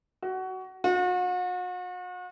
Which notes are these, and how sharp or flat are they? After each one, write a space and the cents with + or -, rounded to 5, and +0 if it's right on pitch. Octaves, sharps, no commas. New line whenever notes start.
F#4 +20
F#4 -40